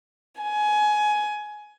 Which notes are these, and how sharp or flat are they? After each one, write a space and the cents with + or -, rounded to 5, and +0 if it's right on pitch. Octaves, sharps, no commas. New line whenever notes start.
G#5 +20